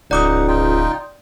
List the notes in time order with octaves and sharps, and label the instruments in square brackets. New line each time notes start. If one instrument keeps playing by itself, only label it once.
[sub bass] D1 [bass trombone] C#2 [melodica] D#4 F#5 [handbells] D5 D6 D#6
[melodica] D#4 F4 G5